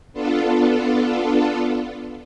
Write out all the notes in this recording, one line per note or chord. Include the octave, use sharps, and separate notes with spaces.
B3 D4 F4 A4